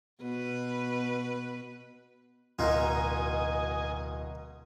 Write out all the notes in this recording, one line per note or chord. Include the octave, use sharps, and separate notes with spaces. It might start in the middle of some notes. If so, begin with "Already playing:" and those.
B2 B4
D1 B2 D#4 F4 A#4 D#5 G#5